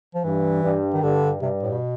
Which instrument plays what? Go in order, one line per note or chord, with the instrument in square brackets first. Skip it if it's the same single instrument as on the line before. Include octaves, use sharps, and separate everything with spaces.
[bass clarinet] F3
[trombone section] G2 [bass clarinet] E3
[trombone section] G2
[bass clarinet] D#3
[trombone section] G2 [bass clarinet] D3
[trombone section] G2 [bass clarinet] C3
[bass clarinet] A2
B2